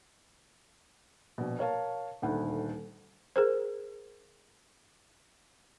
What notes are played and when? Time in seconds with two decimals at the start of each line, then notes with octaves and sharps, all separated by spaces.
1.38 A#1 B2
1.59 A#4 C#5 F5 A5
2.22 D#1 D2 D#3 F#5
3.36 G#4 A#4 C5